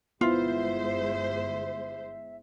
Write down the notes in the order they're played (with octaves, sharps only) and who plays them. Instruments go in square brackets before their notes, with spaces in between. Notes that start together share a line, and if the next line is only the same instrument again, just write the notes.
[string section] G1 G#3 C5 [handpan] B3 E4 [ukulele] F4 [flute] E5